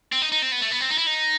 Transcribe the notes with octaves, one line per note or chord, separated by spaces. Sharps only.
C4
D#4
D#4
C4
B3
A3
B3
C4
D#4
E4
D#4